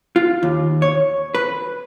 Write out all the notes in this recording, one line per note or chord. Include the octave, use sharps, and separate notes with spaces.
F4
D#2
C#5
B4